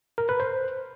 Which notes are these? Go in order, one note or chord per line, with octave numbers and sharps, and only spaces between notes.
A#4
B4
C5